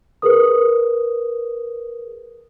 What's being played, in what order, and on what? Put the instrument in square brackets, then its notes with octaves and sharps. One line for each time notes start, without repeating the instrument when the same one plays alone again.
[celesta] G#4 A#4 B4 D#6